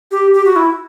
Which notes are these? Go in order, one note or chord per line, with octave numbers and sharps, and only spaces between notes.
G4
G4
F#4
E4